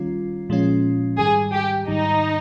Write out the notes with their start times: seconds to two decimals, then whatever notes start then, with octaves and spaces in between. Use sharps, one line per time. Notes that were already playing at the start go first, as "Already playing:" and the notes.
Already playing: D#3 G3 C#4 F4
0.49 A#2 F3 G#3 C#4 F4
1.18 G#2 D#3 G3 G#4
1.53 G4
1.88 G#2 D#3 G3 D#4